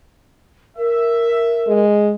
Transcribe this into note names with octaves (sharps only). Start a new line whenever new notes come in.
A#4 E5
G#3